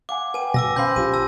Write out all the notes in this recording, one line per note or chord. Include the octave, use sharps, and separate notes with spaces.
F5 F#5 G#5 D6
B4 G5 G#5 D#7
B2 D6 E6 A#6
C#4 C5 F5 G5 B5 C6 G6
B1 F4 G4 D#7
A5 E6